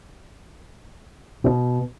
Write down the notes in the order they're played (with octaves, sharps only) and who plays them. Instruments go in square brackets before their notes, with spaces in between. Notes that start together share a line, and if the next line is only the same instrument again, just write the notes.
[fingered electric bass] B2